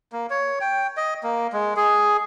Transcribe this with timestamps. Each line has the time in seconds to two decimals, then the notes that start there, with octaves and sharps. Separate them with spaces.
0.12 A#3
0.30 C#5
0.61 G5
0.97 D#5
1.23 A#3
1.53 G#3
1.77 G#4